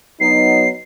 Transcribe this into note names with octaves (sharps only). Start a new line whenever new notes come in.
F#3 B3 D#4 C7